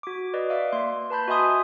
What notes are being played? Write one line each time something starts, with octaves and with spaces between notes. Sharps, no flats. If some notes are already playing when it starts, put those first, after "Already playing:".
F#4 D6
B4 D5 D#5
D5 E5 F5 D6
A#3 C6
B4 A5 B5 G6
F#4 D#5 E5 G#5 C6 D#6